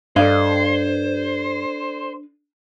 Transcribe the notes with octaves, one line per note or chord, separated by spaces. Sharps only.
G2 D4 A4 C5 D5 D#5 F5 G#6